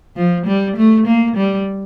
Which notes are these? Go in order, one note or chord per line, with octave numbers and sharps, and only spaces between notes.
F3
G3
A3
A#3
G3